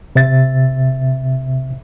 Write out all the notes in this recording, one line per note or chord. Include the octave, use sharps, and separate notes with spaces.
C3 C5 E5 A6